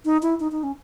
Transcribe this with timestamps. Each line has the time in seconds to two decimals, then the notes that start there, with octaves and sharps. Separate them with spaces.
0.05 D#4
0.22 E4
0.40 D#4
0.52 D#4
0.63 C#4